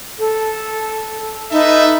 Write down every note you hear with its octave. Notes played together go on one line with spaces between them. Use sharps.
A4
D#4 A4 B4 E5